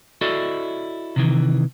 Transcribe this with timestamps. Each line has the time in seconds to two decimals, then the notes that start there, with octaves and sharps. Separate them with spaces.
0.21 E4 F#4 A4 D5 D#5
1.16 C3 D#3 E3